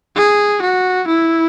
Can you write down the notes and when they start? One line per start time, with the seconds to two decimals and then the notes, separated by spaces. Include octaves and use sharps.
0.16 G#4
0.62 F#4
1.07 E4